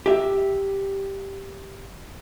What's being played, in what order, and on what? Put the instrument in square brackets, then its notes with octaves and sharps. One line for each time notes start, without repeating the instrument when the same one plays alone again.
[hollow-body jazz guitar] G4 E5